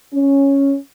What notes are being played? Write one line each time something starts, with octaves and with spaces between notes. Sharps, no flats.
C#4